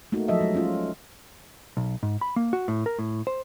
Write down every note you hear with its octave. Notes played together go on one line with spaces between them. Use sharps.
A3 A#3 D#4 F#4
F3 F#3 A4 D#5 E5
G#3
C#4 F4
B1
G#2
B5
A#3
F#4
A2
A#4
A2
C5